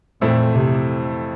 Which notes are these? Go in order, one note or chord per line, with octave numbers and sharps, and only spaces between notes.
F2 A#2 E3 A3 C4 E4
C3